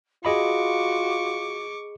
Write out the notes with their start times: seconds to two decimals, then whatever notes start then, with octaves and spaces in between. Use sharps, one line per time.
0.25 F4 F#4 G#4 D#5 B5 C#6 D6